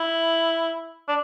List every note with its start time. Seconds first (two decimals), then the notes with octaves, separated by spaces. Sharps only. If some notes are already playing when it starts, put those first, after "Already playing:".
Already playing: E4
1.09 D4